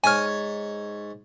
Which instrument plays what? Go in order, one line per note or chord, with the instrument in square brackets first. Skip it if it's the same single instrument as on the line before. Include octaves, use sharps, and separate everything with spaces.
[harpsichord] G#2 C#5 [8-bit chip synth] G#5 F6